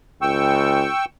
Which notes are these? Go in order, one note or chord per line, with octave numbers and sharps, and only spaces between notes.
C#2 G5 C#6 E6